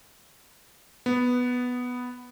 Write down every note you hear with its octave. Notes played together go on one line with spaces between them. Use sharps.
B3